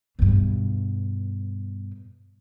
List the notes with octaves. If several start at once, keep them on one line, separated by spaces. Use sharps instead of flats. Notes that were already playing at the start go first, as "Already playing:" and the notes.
G2 B2